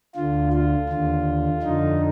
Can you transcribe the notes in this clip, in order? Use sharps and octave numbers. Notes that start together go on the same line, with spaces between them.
D2 D3 F4
F4
D#2 D3
F2 D3 D#4